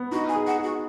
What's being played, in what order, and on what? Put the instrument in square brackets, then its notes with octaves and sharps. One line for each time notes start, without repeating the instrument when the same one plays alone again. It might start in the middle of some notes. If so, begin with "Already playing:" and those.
Already playing: [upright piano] B3
[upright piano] D#4 [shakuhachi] F#4
[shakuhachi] G#5
[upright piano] G#4
[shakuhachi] F#5
[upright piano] G#4
[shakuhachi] F#4